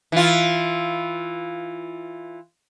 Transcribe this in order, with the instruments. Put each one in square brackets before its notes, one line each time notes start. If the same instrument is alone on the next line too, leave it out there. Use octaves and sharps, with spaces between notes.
[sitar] E3 F4